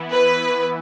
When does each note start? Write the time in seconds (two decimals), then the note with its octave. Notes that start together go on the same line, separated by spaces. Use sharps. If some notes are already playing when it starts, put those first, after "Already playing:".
Already playing: E3 B3 E4
0.11 B4